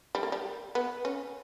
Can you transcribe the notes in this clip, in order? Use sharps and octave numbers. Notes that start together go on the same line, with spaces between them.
G3
A#3
G3
B3
C#4